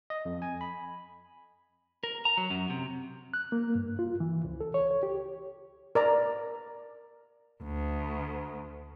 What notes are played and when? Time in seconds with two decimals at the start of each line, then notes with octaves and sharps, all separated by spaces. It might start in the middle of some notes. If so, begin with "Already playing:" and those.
0.10 D#5
0.25 F2
0.42 G#5
0.61 B5
2.04 A#4
2.25 A#5
2.37 F#3
2.50 F#2
2.70 C3
3.34 F#6
3.52 A#3
3.75 G2
3.99 F4
4.20 E3
4.45 C#2
4.61 A4
4.74 C#5
4.91 C#5
5.03 G4
5.95 A#4 D5 A#5
7.63 D2